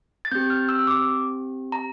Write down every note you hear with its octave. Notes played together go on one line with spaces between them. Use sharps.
A6
C4 G4 G6
F6
E6
D6
A#5